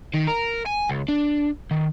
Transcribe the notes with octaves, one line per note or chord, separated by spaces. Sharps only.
D#3
A#4
G#5
C#2
D4
D#3